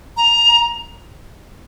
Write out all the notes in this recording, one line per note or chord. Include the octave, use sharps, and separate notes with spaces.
A#5